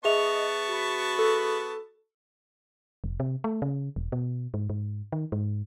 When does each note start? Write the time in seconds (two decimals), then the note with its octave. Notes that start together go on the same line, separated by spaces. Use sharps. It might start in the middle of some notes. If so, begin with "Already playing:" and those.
0.05 B3 G#4 D#5 E5 A5 C#6 F7
0.69 F#4 B5
1.19 A4
3.04 F1
3.20 C3
3.44 A3
3.62 C#3
3.96 E1
4.12 B2
4.54 G#2
4.70 G#2
5.12 D#3
5.32 G#2